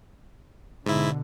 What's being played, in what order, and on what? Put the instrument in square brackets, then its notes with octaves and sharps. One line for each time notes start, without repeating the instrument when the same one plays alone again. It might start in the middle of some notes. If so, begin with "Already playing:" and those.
[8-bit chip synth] G#2 E4 [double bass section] B2 D3